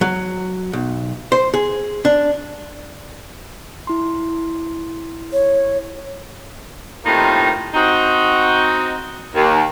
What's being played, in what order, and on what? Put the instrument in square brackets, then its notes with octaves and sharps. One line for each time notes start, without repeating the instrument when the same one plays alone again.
[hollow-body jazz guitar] F#3
B1
C5
G#4
D4
[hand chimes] E4 C6
[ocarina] C#5
[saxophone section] A2 C3 D#3 A#3 D#4 F4
C4 D#4 F#4
D#2